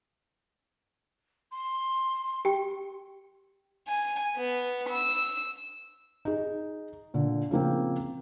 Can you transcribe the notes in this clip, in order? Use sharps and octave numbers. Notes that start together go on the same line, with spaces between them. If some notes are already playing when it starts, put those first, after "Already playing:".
C6
G4 G5
G#5
B3
E6
D#4 G#4
A#2 D3
C#3 F3 A#3 C4